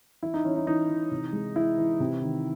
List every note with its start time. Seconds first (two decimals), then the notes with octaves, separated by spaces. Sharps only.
0.23 E3 E4
0.34 D#4
0.44 E3 C#4
0.56 D#4
0.67 E3 D#4
0.89 E3
1.11 C3
1.33 G#3
1.55 E3 E4
1.78 E3
2.00 C3
2.22 D#3